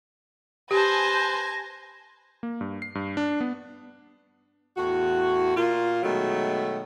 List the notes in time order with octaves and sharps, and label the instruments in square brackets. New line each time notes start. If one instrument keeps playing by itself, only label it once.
[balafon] G4 [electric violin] B4 C5 [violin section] G#5 A5 G#6 [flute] A#6
[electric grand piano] A#3
G2
C7
G2
D4
B3
[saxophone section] E2 A2 F#4
A#2 F4
B2 D#3 F#3 G#3 A3